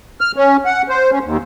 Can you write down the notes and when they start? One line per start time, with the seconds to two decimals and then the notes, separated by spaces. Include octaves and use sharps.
0.21 F6
0.36 C#4
0.66 F#5
0.89 C5
1.11 C#4
1.24 D#2